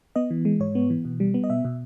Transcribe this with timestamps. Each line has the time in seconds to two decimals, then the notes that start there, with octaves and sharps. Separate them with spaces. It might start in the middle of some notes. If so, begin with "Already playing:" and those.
0.16 B3 D#5
0.31 E3
0.45 G#3
0.60 G#2 C#5
0.75 B3
0.90 E3
1.05 B2
1.20 G3
1.34 B3
1.44 D#5
1.50 B2 E5
1.65 B2